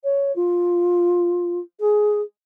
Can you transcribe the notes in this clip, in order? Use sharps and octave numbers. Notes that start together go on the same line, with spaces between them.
C#5
F4
G#4